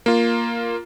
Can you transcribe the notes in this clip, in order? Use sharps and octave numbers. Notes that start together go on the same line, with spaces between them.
A#3 F4